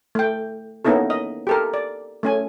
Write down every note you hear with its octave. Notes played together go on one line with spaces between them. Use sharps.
A3 G5
A#3 B3 C#4 D#4 E4 A4
D#5
G4 A4 A#4
D5
A3 C#4 G#5